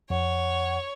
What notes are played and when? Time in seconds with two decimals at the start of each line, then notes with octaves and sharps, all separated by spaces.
0.10 F2 C#5 F#5